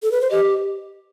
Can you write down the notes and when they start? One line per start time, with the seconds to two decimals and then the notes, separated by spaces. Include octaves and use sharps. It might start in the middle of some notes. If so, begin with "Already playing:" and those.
0.03 A4
0.12 B4
0.21 C5
0.30 G4 D#5